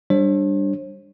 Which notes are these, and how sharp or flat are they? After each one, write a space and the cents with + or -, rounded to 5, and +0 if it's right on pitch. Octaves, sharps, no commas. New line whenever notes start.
G3 +0 D4 +0 C5 +45